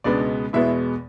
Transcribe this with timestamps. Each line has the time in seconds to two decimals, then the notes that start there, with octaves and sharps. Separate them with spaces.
0.04 C#2 B2 G#3 B3 D4 D5
0.53 E2 B2 G#3 B3 E4 E5